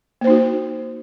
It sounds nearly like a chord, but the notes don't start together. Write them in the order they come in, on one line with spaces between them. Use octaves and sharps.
A#3 C5 D#4 F#4